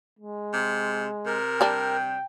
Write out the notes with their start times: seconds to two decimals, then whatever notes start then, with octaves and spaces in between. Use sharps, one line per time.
0.19 G#3
0.53 C3
1.26 C3 A#4
1.61 G3 D4 G5